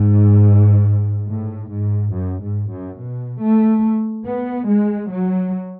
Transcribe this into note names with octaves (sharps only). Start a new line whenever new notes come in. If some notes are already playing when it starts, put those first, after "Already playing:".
Already playing: G#2
A2
G#2
F#2
G#2
F#2
B2
A3
B3
G#3
F#3